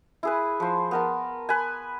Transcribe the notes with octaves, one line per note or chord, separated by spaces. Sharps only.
E4 G#4 B4
F3 C5
B3 A#4 A5
B4 G#5